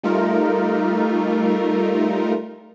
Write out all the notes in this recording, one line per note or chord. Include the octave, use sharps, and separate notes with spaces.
G3 A3 D#4 F4 A#4